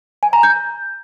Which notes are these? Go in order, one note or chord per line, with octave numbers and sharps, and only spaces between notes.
G#5
A#5
G6